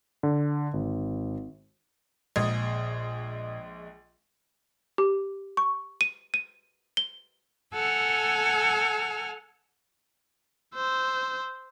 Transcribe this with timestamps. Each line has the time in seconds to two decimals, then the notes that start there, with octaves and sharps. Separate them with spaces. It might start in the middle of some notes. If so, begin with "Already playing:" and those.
0.23 D3
0.73 G#1
2.36 A#1 A#2 G#3 D#6 G#6
4.98 G4
5.57 C#6
6.01 D#7
6.34 D#7
6.97 G7
7.74 A4 F#5 G#5 E6 F6
10.75 C5 E6